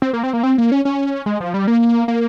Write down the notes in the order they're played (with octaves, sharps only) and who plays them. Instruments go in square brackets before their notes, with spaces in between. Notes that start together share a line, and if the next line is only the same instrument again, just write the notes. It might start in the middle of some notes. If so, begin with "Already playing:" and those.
[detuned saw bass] C4
A#3
C4
A#3
C4
A#3
C#4
C#4
G#3
F3
G3
A#3
A#3